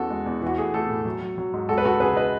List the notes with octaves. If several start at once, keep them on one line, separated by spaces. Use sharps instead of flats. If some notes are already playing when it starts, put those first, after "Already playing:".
Already playing: E2 C#4 F#4 A4
G#3
E2
E3
F#4
A3 G#4
A3 F#4 A4
A2
F#3
F#3
F#3
G#2
G#3 F#4 A4
B4
C#2 F#4 A4
C#3 G#4 B4
B4 D#5